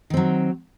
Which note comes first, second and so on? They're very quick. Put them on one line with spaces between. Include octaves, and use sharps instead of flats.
D#3 C4 F#3